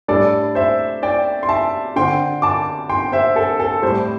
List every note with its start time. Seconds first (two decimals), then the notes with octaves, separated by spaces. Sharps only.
0.08 A2 G3 D4 A4 D5
0.55 C5 E5
1.03 D5 G5
1.43 C6
1.49 E5 A5
1.96 D3 C4 G5 C6
2.42 A5 D6
2.89 G5 C6
3.12 C5 E5
3.36 A4
3.60 A4
3.82 A2 G3 C4 C5